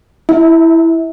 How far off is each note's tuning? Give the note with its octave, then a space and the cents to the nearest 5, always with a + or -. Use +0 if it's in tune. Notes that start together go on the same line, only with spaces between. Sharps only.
E4 +0 E5 -30